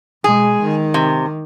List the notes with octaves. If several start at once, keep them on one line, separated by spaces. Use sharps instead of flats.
B2 G#3 G#4
D#3
C3